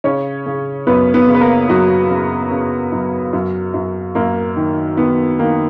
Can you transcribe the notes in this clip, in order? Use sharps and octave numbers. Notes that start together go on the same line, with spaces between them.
C#3 C#4 C#5
C#3
F#2 B3 B4
B3 B4
C#3
B4
A#3 A#4
F#2 F#3 F#4
C#3
C#3
F#2
F#2
F#2
F#2 A#3
D#3
D#3 B3
D#3 A#3